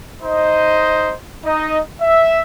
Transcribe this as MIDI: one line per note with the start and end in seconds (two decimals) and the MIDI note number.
0.22 1.14 63
0.22 1.14 72
0.22 1.14 75
1.44 1.79 63
1.44 1.79 75
2.01 2.41 76